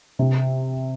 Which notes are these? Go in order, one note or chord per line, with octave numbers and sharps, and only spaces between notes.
C3